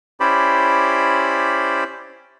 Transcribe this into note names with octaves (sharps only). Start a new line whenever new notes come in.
C#4 E4 G4 C5 D5 B5